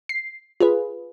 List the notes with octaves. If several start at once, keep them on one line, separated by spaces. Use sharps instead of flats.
C7
F4 G#4 B4